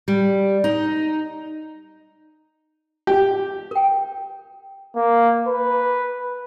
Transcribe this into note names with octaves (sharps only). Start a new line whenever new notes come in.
G3
D#4
G4
A#4 G5
A#3
B4